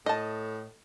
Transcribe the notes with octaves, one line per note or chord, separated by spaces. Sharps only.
A2 D#5 A5